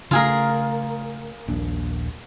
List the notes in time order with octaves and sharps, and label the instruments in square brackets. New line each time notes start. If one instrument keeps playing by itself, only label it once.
[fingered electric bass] C#3 A3 [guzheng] F4 G#4 A#4
[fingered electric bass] D#1 A#1 D4